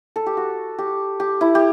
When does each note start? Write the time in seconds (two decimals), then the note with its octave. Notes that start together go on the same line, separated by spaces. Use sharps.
0.16 A4
0.26 G4
0.37 F#4
0.78 G4
1.20 G4
1.41 E4
1.55 G4